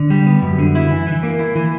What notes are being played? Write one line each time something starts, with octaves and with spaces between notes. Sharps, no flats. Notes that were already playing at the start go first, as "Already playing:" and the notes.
Already playing: D3
G3
B3
F#2
D3
E4
E3
E3
A#3
E4
E3